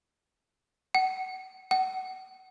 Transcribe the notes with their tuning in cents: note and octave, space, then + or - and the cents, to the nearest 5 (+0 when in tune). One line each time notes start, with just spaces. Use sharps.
F#5 +30
F#5 +30